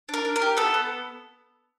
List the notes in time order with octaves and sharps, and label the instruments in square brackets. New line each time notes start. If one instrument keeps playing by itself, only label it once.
[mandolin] D4 A#4
D4
A#4
G4
B3 A4
B3